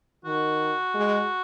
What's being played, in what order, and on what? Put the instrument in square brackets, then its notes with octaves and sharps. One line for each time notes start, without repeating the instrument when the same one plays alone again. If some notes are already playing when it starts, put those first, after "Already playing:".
[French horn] D#3 [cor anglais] F#4
[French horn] G#3